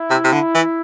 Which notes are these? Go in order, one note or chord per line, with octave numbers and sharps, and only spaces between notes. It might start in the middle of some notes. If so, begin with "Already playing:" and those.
Already playing: E4
C3
C3
D3
E3